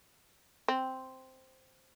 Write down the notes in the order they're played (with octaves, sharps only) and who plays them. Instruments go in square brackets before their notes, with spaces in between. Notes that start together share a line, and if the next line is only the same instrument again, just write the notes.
[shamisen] C4